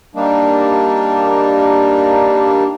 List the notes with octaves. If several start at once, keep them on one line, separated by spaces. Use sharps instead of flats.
G3 A#3 D4 D#4